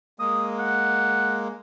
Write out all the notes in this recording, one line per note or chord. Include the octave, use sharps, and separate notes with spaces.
G#3 A#3 D#6
F#5